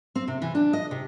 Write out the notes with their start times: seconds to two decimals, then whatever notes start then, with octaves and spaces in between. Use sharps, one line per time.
0.15 C4
0.28 C3
0.42 E3
0.55 D4
0.73 D#5
0.91 C3